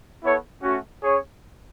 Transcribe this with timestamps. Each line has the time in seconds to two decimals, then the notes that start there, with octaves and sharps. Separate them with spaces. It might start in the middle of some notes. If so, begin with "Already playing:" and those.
0.22 B3 E4 A4 C#5
0.62 A3 C#4 F#4
1.03 C#4 G#4 C#5